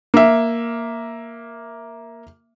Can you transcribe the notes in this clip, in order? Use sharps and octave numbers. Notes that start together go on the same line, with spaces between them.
A#3 E5